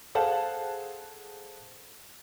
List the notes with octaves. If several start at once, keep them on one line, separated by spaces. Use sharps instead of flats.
G#4 A4 C5 F5 F#5 A5